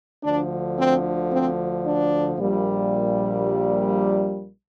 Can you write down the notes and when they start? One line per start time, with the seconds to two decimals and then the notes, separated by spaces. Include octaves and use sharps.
0.24 D2 D3 F3 D4
0.78 C4
1.32 C4
1.85 D4
2.38 A#1 A#2 G3